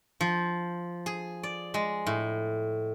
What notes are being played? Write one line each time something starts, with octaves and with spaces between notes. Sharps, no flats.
F3
G#4
D5
G#3
A2